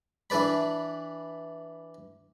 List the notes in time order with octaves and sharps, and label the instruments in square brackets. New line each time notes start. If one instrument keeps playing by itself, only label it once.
[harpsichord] E3 D4 B4 D5 B5